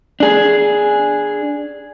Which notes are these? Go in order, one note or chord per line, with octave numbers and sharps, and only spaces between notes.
D4 G#4